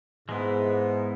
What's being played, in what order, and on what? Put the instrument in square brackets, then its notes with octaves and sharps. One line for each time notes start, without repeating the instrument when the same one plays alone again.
[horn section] G#2 [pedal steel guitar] G#3 B3 E4